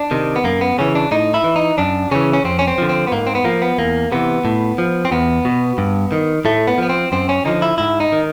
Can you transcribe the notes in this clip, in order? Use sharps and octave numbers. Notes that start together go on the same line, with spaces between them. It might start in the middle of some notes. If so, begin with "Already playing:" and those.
Already playing: D4
C3 D#3
B3
F#2 A#3
B3
C#3 E3 C#4
D4
A2 D#4
E4
E3
D#4
F#2 D4
C#3 E3 C#4
C#4
F2 C4
C#4
C4
D3 F3
C4
B3
G#2 A#3
C4
B3
F3 A#3
B3
E2 A#3
C3 E3 B3
A2
F3
C4
E2 B3
B2
G2
D#3
A2 A3
B3
F3 B3
C4
F#2 C4
C#4
D3 F3 D#4
E4
G#2 E4
D#4
D#3